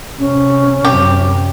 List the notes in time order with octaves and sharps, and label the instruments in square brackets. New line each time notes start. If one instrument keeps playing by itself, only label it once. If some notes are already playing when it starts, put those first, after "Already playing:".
[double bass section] C3 [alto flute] C#4
[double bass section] F#2 C3 [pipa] G4